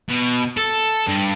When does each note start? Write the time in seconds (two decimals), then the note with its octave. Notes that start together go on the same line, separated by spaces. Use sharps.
0.09 B2
0.57 A4
1.07 G2